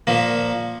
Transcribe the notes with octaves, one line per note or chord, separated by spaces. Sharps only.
A#2 F3 A#3